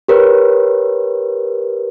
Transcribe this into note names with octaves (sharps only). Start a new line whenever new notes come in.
G4 A#4 B4 C#5